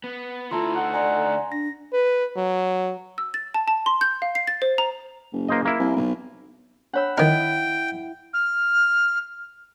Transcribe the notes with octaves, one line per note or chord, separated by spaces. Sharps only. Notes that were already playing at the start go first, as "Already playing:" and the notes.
B3
D3 A3 E4 F4 A5 A#5 C6
D#4 A4 F#5
D5 G#5 A#5 C6
D4 A#6
B4
F#3
E6
A6
A5
A5
C6
G6
F5
C7
A6
C5
A#5
F#1
A#3 C5 D#5
A#3 E4
C2
B1
D4 C#5 F#5 B5 E6
D#3 E4 A#4 D#5 G5
F6